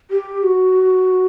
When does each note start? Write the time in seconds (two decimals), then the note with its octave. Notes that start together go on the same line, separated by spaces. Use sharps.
0.11 G4
0.43 F#4